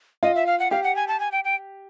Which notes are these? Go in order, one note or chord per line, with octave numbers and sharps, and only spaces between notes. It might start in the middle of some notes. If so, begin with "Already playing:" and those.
F4 D#5
E5
F5
F#5
G4 F5
F#5
G#5
A5
G#5
G5
G5